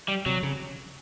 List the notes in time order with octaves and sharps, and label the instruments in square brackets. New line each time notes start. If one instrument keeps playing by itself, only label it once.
[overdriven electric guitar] G3
[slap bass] C3 [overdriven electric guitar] F#3
[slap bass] C#3